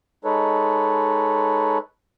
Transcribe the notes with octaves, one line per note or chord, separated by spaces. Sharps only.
G#3 D#4 A4 B4 C#5